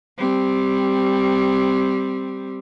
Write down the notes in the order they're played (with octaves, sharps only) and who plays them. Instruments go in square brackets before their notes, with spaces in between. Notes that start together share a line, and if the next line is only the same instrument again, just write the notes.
[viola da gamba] G3 C4